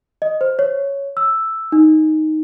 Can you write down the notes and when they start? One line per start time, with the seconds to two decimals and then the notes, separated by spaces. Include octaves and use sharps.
0.22 D#5
0.41 C5
0.59 C#5
1.17 E6
1.72 D#4